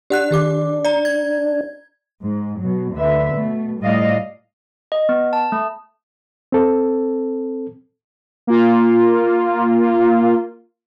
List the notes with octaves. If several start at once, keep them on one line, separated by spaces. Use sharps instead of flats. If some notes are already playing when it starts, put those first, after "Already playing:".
D4 G4 F#5 F#6
D#3 G4 D6
D5 A#5
G#6
G#2
B2 F#3
D2 D3 B4 E5
B2 A3
A2 F3 G3 D5 D#5 F5
D#5
B3
A5
A3
C4 A4
A#3 F4